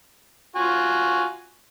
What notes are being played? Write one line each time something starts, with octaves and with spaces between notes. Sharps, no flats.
F4 F#4 G#5